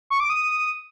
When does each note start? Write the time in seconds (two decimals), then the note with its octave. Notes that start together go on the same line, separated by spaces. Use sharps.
0.10 C#6
0.20 D6
0.30 D#6